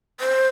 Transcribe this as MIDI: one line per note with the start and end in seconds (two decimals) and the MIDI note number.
0.20 0.48 72